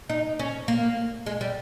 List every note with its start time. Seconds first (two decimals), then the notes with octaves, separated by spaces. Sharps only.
0.09 D#4
0.39 C#4
0.68 A#3
1.26 G#3
1.41 G3